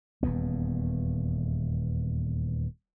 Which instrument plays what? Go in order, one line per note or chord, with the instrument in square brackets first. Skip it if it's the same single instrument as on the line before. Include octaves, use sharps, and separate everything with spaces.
[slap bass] D#1 E2 B3